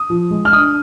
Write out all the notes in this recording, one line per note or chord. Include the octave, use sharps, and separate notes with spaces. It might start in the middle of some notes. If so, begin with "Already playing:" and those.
Already playing: D#6
F3
G#3
F6
D4 D#6